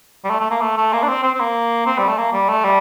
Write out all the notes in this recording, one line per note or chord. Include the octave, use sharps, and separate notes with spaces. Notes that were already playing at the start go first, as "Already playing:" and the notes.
G3
A3
A3
A#3
A3
A3
A#3
D4
C4
C4
C4
A#3
C4
G3
A3
A#3
G3
A3
G3